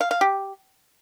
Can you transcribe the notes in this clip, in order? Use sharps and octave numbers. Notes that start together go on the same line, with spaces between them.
F5
F5
G4